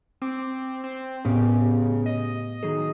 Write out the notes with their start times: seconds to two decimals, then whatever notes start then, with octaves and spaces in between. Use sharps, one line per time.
0.22 C4 D6
0.84 C4
1.25 A2 C#3 B3 G4
2.06 D#5
2.63 D#3 F#3 G#4